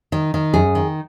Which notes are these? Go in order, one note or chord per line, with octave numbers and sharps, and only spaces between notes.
D#3
D#3
F#2 G#4
D#3